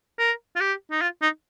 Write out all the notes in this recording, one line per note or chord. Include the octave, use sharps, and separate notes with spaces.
A#4
F4
G4
D#4
F4
D#4